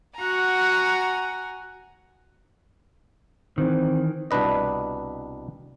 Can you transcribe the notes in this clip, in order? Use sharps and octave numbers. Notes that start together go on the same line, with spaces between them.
F#4 F#5 G#5 A#5
D#3 E3 C4
C2 B2 D4 B4 D#5